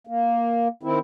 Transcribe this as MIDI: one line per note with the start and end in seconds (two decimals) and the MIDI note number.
0.07 0.68 58
0.83 0.99 51
0.83 0.99 60
0.83 0.99 64